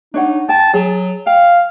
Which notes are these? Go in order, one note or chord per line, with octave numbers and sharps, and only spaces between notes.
D4 D#4 C#5 F#5
G5 A5
F#3 G#4
F5 G5